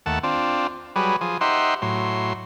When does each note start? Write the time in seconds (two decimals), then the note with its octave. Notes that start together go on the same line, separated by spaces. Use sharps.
0.06 D#2 A3 F#5 A5
0.24 C4 D4 F4
0.96 F#3 G3 G#4 B4
1.21 F3 G#4
1.41 D#4 G4 C5 E5 F#5 C6
1.82 A2 F#3 C6